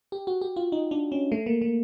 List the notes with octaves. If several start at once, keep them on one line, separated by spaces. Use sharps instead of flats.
G4
F#4
G4
F4
D#4
D4
C#4
A3
A#3
A#3